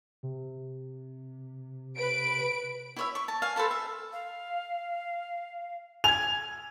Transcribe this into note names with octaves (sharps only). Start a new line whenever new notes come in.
C3
B4 D7
E4 C#5 E5
C#6
A5
F5 G#5
A4 B4 C5 A5
E5
F5
G#5 G#6 F7